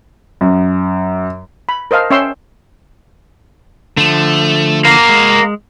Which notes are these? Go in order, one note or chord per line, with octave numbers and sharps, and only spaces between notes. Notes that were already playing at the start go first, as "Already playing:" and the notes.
F#2
B5
A#4 C5 D#5 F5 A5
C#4 C#5 E5 G5 C6 E6
D3 F3 A3
A#3 F#4 A#4 F5
G#3